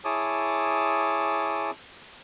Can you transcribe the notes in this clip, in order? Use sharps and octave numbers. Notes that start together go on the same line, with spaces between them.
E4 G#4 C#5 A5 D6 D#6